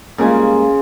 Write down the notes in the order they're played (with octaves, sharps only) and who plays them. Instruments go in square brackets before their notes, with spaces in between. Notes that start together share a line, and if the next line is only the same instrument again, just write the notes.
[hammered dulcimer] C#3 F4 G#5 [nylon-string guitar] G3 G#3 A#3